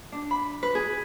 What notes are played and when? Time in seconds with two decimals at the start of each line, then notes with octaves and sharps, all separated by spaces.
0.12 D4
0.31 B5
0.63 B4
0.75 G#4